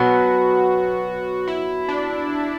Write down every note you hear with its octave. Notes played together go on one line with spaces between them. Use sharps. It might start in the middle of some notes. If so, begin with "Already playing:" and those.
Already playing: B2 F#3 B3 F#4
E4
D4